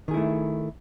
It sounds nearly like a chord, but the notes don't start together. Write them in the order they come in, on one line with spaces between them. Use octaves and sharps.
D#3 G#4 E4 A3